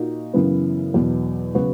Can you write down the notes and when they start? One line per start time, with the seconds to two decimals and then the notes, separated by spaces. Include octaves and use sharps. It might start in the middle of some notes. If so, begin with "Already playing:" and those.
Already playing: A#2 A#3 D#4 F#4
0.34 F#2 C#3 E3 B3
0.94 E2 B2 F#3
1.55 C#3 F#3 B3 F#4